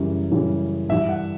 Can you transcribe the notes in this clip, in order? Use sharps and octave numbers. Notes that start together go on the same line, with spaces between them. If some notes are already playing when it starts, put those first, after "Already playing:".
Already playing: F#2 C#3 E3 G3
F#2 C#3 E3 G3
G2 E3 G3 E5
F#5